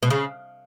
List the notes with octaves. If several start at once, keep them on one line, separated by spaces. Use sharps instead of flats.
B2
C#3